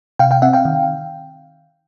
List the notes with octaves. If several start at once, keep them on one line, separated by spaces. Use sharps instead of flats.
C3 F5 G5
F5 G5
C4 E5 F#5
F5 G5
D#3